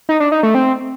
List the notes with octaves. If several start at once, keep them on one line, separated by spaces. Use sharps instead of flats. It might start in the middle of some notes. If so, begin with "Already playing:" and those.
D#4
D4
D#4
A3
C4